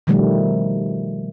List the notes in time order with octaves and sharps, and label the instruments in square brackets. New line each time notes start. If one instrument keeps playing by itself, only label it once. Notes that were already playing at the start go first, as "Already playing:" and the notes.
[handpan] B2 D#3 F3 G3 A3